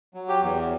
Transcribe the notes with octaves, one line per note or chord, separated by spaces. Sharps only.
F#3
G4
E2